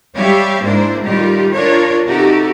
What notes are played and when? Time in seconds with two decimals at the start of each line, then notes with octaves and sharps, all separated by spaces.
0.15 G3 G4 C#5 E5 F5
0.64 G#2 A#3 D4 E4 C5
1.03 A2 D#3 G3 D#4 F4 G4
1.53 D4 F4 A#4 C#5
2.06 C3 D#4 F#4 G4 A4